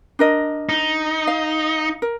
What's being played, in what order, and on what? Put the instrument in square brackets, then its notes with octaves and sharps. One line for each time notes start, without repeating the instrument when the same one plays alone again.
[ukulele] D4 A#4 D#5
[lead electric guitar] D#4
[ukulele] F5
A#4